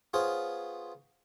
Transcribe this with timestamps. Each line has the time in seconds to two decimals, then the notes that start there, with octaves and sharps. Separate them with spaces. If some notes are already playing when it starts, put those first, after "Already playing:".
0.13 B3 F4 G#4 C5 C#5